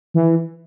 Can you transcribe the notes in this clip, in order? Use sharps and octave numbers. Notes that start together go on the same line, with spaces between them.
E3